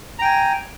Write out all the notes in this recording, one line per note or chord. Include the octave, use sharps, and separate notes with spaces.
G5 G#5 A#5